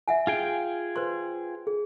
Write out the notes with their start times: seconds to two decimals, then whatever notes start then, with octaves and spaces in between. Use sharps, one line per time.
0.08 E5 F#5 G#5
0.27 F4 G#4 G5
0.96 B4 C5 C6
1.67 G#4